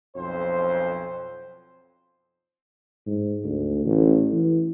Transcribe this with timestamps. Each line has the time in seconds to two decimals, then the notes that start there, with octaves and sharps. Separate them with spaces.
0.16 B1 F2 C5
3.07 G#2
3.44 D2
3.85 A1
4.32 E3